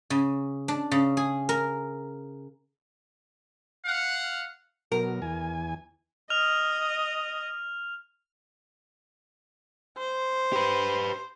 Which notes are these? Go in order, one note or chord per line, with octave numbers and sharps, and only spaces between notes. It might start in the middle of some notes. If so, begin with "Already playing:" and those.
C#3
D4
C#3
G#4
A#4
F5 F#5
B2 F#3 A#4
E2 G#5
D#5 F6 F7
C5
G4 B4